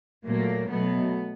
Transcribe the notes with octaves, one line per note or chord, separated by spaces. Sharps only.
A#2 F#3 A3 A#3
B2 F#3 A3 B3